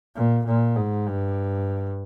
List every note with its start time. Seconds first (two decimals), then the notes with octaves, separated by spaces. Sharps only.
0.15 A#2
0.46 A#2
0.76 G#2
1.07 G2